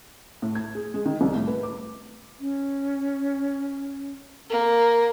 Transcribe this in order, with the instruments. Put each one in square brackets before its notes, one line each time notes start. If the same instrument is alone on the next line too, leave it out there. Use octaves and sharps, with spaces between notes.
[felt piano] A2
G#6
G#4
G#3
D#3
C2
A2
B4
D6
[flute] C#4
[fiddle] A#3